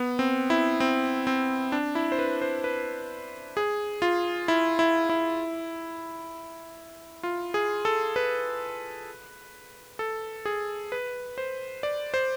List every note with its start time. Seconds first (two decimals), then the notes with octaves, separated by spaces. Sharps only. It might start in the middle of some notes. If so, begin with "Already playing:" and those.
Already playing: B3
0.19 C4
0.50 E4
0.80 C4
1.27 C4
1.72 D4
1.95 E4
2.12 C5
2.19 B4
2.42 C5
2.64 B4
3.57 G#4
4.02 F4
4.48 E4
4.79 E4
5.09 E4
7.23 F4
7.54 G#4
7.85 A4
8.16 B4
9.99 A4
10.45 G#4
10.92 B4
11.38 C5
11.83 D5
12.14 C5